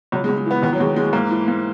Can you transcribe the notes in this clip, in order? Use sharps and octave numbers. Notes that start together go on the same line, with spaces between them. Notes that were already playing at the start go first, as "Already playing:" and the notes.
C#2 F#3
G#3
C#2
G#3
E3 B3
D#2 B3
F#3
D#2 G#3
E3 G#3
G#3
G#2 A#3
E3
G#2